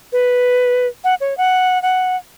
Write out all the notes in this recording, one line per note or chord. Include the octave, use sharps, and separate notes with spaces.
B4
F#5
C#5
F#5
F#5